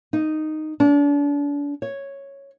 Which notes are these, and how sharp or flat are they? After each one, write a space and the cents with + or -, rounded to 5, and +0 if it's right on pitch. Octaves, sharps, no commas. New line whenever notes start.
D#4 -5
D4 -35
C#5 -5